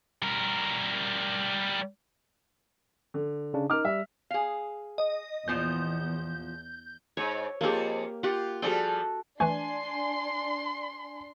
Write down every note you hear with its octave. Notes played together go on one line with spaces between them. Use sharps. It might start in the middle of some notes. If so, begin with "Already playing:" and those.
G3 A#4
D3
C#3 D4
D#4 A#4 D6 F6
G3 E5
G#4 F5
D#5
E2 A#2 F3 B3 G6
G#2 C#5
F2 A#3 F4 G4 G#4
F4 G4 F#5
F3 G3 F#4 G#4 A4 G5
E3 A3 D4 G#5 C6